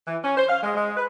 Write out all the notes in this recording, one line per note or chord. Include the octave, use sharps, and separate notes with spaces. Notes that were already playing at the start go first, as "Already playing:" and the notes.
E3
C#4
C5
F5
G#3
G#3
B4